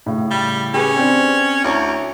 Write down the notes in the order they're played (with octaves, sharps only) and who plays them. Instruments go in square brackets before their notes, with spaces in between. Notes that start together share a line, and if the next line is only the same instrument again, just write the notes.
[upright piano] A2 C#3
[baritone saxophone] G3
[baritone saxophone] C#4 [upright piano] G4 G#4 B4
[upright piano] C4 D4
[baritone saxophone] D2 [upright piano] E4 C#5 A#5